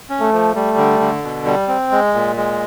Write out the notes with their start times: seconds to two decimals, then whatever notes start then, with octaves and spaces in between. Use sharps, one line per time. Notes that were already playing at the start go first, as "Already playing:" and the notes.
0.09 C#4
0.21 A3
0.32 F3
0.55 G3 A3
0.77 D3
1.00 D3
1.23 B2
1.45 G3
1.68 C4
1.91 G#3
2.14 A#2
2.36 G#3